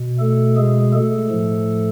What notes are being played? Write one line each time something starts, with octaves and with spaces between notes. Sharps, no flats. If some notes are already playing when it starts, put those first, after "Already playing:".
Already playing: B2
A3 A4
G#3 G#4
A3 A4
A2 F3